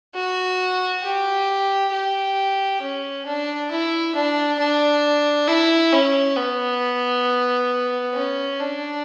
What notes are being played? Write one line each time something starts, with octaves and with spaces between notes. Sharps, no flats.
F#4
G4
G4
C#4
D4
E4
D4
D4
E4
C#4
B3
C#4
D4